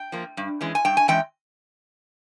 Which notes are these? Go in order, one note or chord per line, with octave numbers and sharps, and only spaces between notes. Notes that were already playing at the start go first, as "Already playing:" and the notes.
Already playing: G5
F3 A#3
G2
E3 G#3 C#4
G#5
G2 G5
G#5
E3 G#3 C#4 G5